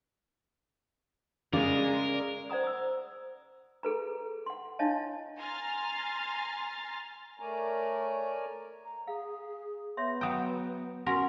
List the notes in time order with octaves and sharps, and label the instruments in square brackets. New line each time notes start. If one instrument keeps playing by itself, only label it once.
[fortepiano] C#3 [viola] G#3 [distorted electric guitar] A#4 [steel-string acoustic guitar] D5
[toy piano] C5 D5 F#5 A#5 D#6
D#6 E6
G#4 A4 B4 A#5
F#5 C6
D4 E4 C#5 D#5 F5 A5
[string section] G#5 A#5 C6 F6 A6
[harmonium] A3 A#4 C#5 D5 G#5 A#5
[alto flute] A#5
[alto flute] G#4 [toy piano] F5
[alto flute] B3 [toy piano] C#5 E5 C6
[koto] F#3 G5 [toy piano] A#5 D#6
[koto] C#4 A#4 [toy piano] F#4 F#5 C6